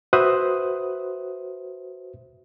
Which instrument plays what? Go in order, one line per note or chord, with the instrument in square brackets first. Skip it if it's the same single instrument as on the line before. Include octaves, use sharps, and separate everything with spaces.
[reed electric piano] F#4 B4 C5 E5 D#6 F#6